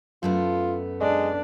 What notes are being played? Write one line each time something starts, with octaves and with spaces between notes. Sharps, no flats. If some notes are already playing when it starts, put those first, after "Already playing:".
F#2 A3 B3 F4
G#3 D4